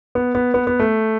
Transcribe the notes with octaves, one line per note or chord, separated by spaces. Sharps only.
B3
B3
B3
B3
A3